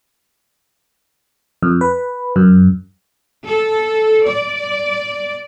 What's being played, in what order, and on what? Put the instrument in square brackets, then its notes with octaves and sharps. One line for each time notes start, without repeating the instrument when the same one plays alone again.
[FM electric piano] F2
B4
F#2
[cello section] A4
D5